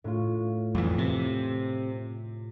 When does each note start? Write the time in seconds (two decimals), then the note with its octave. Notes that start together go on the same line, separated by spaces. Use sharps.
0.04 A2 F4
0.75 F2 E3
0.98 C3